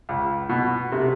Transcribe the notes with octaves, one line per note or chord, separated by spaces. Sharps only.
C#2
B2
C3